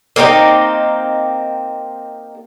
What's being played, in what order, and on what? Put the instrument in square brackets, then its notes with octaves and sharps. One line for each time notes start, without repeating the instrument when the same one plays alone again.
[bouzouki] A#3 C4 D#4 G4